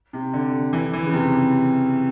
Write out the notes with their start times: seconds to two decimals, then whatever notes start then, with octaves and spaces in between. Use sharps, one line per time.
0.13 C3
0.33 D3
0.73 E3
0.93 E3
1.06 C#3
1.13 C3